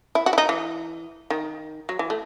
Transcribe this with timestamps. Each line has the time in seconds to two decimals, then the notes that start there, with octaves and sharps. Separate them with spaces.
0.15 E4
0.26 F#4
0.33 E4
0.38 D#4
0.49 E3
1.30 D#3
1.89 F#3
1.99 E3
2.10 A3